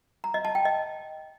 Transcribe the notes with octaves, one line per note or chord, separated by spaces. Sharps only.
A#5
D#5
A5
G5
D#5